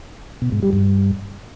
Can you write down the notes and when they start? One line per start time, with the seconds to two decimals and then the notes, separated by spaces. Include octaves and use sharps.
0.42 B2
0.52 G#2
0.62 G3
0.73 G2